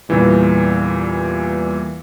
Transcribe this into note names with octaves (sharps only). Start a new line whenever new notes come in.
E2 A#2 E3 G3